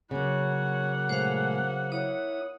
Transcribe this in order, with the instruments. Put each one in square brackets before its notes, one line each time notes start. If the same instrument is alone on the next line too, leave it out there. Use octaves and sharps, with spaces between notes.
[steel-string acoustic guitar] C#3 F#3 [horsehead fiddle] A#3 F#5 [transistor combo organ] C#5
[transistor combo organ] A#2 G#3 A3 [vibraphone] C5 F5
[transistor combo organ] E4 D#6 [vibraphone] C#5